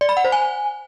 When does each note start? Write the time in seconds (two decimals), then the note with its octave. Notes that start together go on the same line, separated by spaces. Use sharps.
0.01 D5
0.09 B5
0.17 F#5
0.25 C5
0.32 G#5